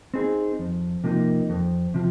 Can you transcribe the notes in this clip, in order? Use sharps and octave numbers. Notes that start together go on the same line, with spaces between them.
C4 D#4 G#4
F2
C3 F3 A#3 D#4
F2
C3 F3